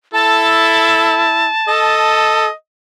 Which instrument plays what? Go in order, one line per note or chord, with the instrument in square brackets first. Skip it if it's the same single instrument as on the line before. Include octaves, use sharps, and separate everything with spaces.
[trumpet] E4 [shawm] A4 [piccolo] A5
[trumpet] A4 [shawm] D#5